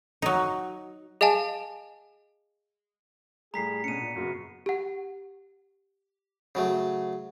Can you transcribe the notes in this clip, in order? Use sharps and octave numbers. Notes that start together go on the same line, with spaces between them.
F#3 D#4
G#4 D#5 F5 G#5 A5
A2 G3 G#4 A#5 B6 C7
B2 C#4 D4 C#7 D#7
A#2
F#2 C#3 B3 F#4
G4 F#5
C#3 F#3 A3